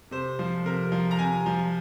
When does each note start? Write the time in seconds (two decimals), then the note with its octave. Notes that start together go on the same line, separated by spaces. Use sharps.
0.11 C3 C5
0.39 F3
0.65 C3 A#4
0.92 F3
1.11 A#5
1.19 C3 G#5
1.46 F3